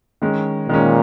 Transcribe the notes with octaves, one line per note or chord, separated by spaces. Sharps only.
D#3 G#3 C#4
A#2 D#3 G#3 C#4